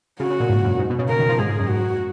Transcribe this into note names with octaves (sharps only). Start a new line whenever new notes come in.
C#3 F#4
C#3
A#2
G#2
F#2
G#2
B2
C#3
C#3 A#4
D#3
F3
G#2 G#4
G#2
F#2
G#2 F#4